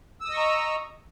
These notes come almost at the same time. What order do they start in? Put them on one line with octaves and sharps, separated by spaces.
E6 D#6 D#5 C#6 A#5